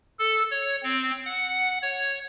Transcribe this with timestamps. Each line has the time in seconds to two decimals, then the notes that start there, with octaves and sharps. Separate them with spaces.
0.19 A4
0.51 C#5
0.83 C4
1.26 F#5
1.82 C#5